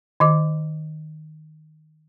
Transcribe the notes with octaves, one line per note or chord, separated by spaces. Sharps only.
D#3 D#5 D6